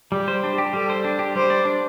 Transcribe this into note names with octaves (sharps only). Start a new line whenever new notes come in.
G3 G4
C5
D4
G4
G3 A4
C5
D4
G4
G3 C5
D5
D4